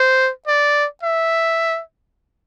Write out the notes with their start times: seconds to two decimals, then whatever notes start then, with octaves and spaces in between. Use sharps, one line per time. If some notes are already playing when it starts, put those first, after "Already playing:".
Already playing: C5
0.47 D5
1.03 E5